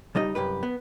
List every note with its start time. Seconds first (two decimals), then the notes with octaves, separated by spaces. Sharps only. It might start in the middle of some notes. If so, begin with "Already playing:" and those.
0.15 C#2 G3 D#4 D#5
0.35 C2 F#2 G4 B4
0.63 B3